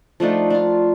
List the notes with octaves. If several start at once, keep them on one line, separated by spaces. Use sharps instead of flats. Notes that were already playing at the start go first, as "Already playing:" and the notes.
F3 A3 D4 D#4
D4 F4